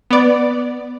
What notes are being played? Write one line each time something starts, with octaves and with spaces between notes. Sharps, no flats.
B3 D5